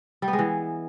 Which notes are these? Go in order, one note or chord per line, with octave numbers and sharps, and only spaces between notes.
G3
B3
G#3
E3